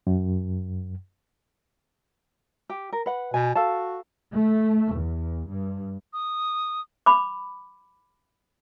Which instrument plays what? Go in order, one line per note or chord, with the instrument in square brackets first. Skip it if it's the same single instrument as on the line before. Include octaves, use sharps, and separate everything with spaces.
[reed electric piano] F#2
[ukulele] G4
A#4
B4 F#5
[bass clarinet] B2 [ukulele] G#5
[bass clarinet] F#4 [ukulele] A4 F5 A5
[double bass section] A3
E2
G2
[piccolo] D#6
[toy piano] B5 D6